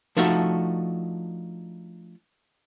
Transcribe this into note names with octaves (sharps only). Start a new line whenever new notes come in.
F3 A3 D4 D#4 F#4 E5